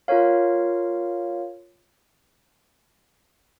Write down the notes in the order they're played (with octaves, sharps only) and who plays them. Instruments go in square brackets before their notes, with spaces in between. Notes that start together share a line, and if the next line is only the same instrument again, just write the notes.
[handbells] F4 A#4 C#5 F5